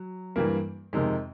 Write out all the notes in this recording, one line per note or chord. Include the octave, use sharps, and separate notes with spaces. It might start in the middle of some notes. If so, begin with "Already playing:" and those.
Already playing: F#3
G2 E3 G3 A#3
F2 C3 D#3 G#3